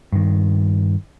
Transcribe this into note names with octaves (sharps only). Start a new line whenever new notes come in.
G2 D#3